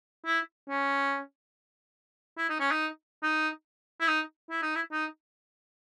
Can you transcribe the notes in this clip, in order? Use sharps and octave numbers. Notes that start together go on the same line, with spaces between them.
E4
C#4
E4
D#4
C#4
D#4
D#4
E4
D#4
E4
D#4
E4
D#4